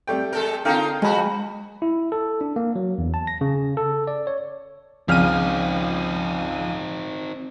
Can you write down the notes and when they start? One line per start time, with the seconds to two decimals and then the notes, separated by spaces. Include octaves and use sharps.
0.07 G3 A3 G5
0.33 G#3 A4 A#4
0.65 D3 D#4 F4 A#4 F5 G5
1.02 F3 G#3 F#4 G#5 B5
1.82 E4
2.12 A4
2.41 D4
2.56 A#3
2.75 F#3
2.98 E2
3.14 A5
3.27 A#6
3.41 C#3
3.77 A4
4.07 D5
4.27 C#5
5.08 G#1 C#2 F3 C4 D#4 F6 D#7